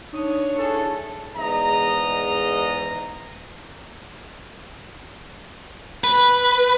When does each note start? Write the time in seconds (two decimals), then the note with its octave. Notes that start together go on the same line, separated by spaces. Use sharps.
0.13 D4 D#4 C#5 D#6 D#7
0.55 E4 G#4 A4
1.35 E2 G#2 D#5 A#5
6.04 B4